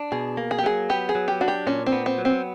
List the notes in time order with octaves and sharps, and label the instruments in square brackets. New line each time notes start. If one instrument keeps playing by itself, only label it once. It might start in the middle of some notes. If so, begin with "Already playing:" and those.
Already playing: [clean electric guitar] D4
[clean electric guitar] B2 [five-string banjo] G#4
[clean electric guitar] A#3
[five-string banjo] G#4
G4
[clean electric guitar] F#3 [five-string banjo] G#4
[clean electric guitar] B3 [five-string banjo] G4
[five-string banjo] G#4
[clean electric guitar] F#3
[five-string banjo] G4
[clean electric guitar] D4 [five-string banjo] F#4
[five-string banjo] G4
[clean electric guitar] A#2 [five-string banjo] C#4
[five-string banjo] C4
[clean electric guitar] B3
[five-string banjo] C4
[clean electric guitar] F#3
[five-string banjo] C4